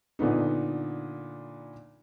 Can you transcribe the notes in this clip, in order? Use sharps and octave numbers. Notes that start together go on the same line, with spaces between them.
A#2 D3 B3 D#4